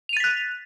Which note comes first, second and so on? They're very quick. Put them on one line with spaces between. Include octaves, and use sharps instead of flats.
F7 D#7 A6 B6 F#6